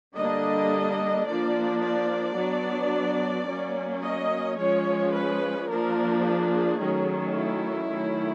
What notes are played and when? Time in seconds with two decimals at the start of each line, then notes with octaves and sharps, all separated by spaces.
0.16 D3 G3 A#3 D4 D#5
1.27 F3 A#3 D4 D5
1.82 D5
2.37 F#3 B3 D4
3.48 F#3 A#3 C#4
4.03 D#5
4.58 F3 G#3 C#4 C#5
5.14 B4
5.69 F3 A#3 D4 A#4
6.24 G#4
6.79 D#3 F#3 A3 C#4
7.34 E4
7.90 D#3 F#3 A3 C#4